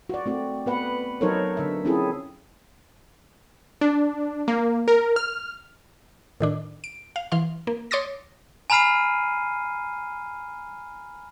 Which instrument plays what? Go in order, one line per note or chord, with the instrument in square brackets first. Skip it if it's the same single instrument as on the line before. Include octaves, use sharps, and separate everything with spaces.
[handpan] F#4 D5
A3 C4 F#4
B3 B4 F#5
F#3 D#4 A4 A#4 C5 C#5
D3 E5
C4 C#4 E4 F4 G#4 A4
[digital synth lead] D4
A#3
A#4
F6
[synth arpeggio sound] A2 D#3 D4
D7
F5
E3 F5 C6
A#3
C#5 C6 D6 D#6 A6 A#6
[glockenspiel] G#5 A#5 B5 F6 C7 D#7